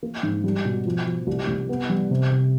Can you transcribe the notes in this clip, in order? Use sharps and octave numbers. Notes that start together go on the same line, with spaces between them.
A#3
G#2
G3
B2
F3
F3
C2
C2
B3
G3
C3
C3